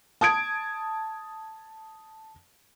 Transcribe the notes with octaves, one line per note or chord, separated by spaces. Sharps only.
A5 D#6 G#6 D7